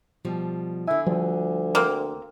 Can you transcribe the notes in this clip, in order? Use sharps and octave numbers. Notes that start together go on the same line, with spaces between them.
B2 F3 G3
D3 E4 G#5
D2 F3 G3
A#3 C4